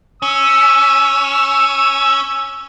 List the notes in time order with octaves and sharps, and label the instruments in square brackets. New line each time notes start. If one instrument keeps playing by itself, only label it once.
[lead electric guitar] C#4 [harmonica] E6